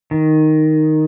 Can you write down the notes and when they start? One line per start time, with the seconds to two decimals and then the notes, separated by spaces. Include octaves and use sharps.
0.11 D#3